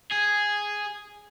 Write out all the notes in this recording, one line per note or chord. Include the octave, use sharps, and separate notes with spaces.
G#4